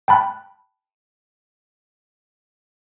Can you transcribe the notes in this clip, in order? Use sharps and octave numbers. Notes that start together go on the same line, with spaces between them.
G5 A5 B5 F#6